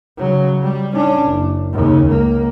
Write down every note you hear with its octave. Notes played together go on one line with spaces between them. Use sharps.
C#3 F#3
G3
C#4 D4
F#1
D#2 C#3
C#2 A#3